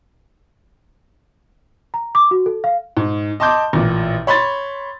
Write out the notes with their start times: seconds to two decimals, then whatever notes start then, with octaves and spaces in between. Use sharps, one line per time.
1.94 A#5
2.15 D6
2.31 F#4
2.46 A4
2.64 F5
2.97 G#2
3.40 D#5 A5 C6 D6 G6
3.73 A1 A#2
4.27 C#5 B5 C6 A6